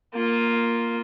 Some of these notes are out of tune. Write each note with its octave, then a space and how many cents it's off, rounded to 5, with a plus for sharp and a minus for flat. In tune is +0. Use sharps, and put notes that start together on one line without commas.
A#3 +0 F4 +0